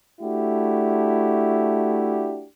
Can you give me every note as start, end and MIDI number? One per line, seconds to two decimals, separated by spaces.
0.20 2.45 57
0.20 2.45 62
0.20 2.45 64
0.20 2.45 66
0.20 2.45 67